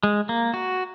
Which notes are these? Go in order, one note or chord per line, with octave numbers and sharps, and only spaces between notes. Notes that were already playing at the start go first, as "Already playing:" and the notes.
G#3
A#3
F#4